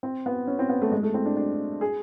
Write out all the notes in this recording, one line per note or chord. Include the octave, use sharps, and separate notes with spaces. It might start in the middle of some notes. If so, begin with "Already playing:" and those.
C4
B3
C#4
C4
B3
A3
G#3
A3
C4
D4
D4
G#4